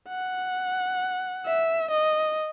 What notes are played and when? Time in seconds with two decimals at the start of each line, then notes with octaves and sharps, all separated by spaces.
0.09 F#5
1.45 E5
1.90 D#5